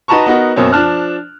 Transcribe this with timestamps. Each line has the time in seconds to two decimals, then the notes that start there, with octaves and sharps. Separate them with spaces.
0.08 D#4 F#4 B4 A5 A#5 C#6
0.26 B3 D#4 F#4 A#4
0.56 F#2 B2 A#3 C4 C#4
0.72 F3 D4 A5 F6 F#6